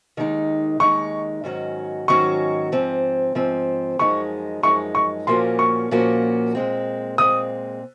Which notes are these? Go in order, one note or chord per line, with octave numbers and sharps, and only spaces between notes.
D#2 D#3 G#3 D#4
D#2 D#3 G#3 D#4 C#6
G#2 D#3 F#3 C#4 F#4
G#2 D#3 F#3 C#4 F#4 C#6
G#2 F3 C4
G#2 F3 C4
F#2 F3 G#3 D#4 G#4 C#6
F#2 F3 G#3 D#4 G#4 C#6
C#6
A#2 F3 A#3 C#4 F#4 C6
C#6
A#2 F3 A#3 C#4 F#4
A#2 G#3 C4
A#2 G#3 C4 D#6